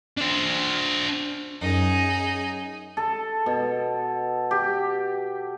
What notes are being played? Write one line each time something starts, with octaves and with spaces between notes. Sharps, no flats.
D4 C5
F#2 D#4 G#4
A4
B2
G4